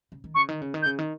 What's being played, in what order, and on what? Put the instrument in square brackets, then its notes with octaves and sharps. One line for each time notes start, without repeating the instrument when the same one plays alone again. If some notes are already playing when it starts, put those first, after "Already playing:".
[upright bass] C#3
D#3
[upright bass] C#3 [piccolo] C#6
[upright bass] D#3
C#3
D#3
[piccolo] G6
[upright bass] C#3
D#3